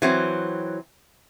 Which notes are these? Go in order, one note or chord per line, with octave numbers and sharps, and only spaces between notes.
E3 F#3 C4